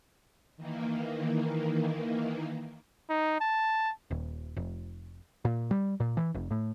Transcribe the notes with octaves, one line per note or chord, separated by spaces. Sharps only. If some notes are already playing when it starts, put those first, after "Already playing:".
D#3 E3 A#3
D#4
A5
D#1
F1
A#2
G3
A#2
E3
F1
A2